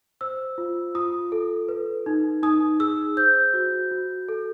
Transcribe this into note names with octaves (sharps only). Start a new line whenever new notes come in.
C5 E6
F4
F4 D#6
A4
B4
D#4
D#4 D#6
G#4 E6
C5 G6
F#4
F#4
A4